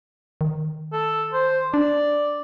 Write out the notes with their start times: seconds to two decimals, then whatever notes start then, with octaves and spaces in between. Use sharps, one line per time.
0.41 D#3
0.93 A4
1.33 C5
1.74 D4 D5